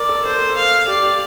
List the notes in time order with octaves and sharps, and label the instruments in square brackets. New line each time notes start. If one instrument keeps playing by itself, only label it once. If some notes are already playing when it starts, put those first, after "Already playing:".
Already playing: [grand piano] A#4 [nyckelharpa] D5
[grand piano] A4
[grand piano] A4 [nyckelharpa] C5
[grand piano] A#4
A4
[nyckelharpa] F5
[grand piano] G4 [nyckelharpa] D5
[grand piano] G4